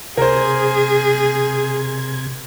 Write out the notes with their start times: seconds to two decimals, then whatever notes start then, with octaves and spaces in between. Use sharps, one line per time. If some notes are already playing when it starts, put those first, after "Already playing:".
0.17 C3 G#4 A#4 C5 G#6